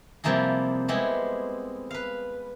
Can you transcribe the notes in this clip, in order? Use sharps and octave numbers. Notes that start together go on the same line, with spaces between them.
C3 F3 G3 A#3 E4 G#4
G#3 B3 C4 E4 G4 G#4
B4 F5